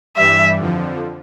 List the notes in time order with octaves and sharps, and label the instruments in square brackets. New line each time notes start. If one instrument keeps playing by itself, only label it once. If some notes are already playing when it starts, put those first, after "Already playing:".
[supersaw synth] G2 E3 G3 [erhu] E5
[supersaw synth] F2 D3 F3